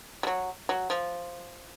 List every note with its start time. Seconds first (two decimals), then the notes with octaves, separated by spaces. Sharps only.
0.23 G3
0.27 F#3
0.69 F#3
0.90 F3